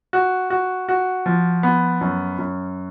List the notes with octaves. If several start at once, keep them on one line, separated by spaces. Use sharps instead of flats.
F#4
F#4
F#4
F3
B3
F#2
F#2